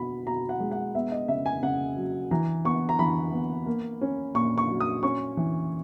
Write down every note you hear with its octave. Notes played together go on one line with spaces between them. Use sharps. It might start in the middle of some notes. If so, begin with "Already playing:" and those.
Already playing: B2 B3 B5
B2 A#5
F#5
G#3
F#5
B3 E5
D#5
C#3 E5
G#5
C#3 F#5
F#3
E3 A#5
B3 C#6
A#5
E3 B5
B3
A#3
C#4
A#2 C#6
C#6
F#3
D#6
C#4 C#6
E3